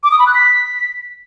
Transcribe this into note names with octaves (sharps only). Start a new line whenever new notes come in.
D6
D#6
B5
F#6
B6